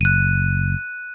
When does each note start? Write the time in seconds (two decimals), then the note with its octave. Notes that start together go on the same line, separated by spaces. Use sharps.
0.01 F#1 F#6 D#7